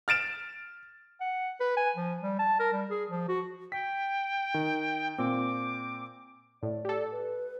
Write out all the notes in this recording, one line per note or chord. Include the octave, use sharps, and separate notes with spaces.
F6 A6 D7 E7
F#5
B4
G#5
F3
G3
A5
A#4
G3
G#4
F3
F#4
G5 B6
D#3
A#2 C4 D6
A2 D5
G4 A4
B4